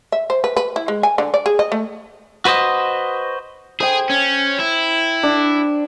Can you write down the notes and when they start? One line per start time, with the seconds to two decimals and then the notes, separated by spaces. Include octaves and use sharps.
0.12 E5
0.30 C5
0.44 B4
0.57 B4
0.76 E4
0.88 G#3
1.03 G#5
1.18 D3
1.34 D5
1.46 G#4
1.59 D#5
1.72 A3
2.45 F#4 B4 C5 D#5
3.80 G#4 C5 G5
4.10 C#4
4.59 E4
5.23 D4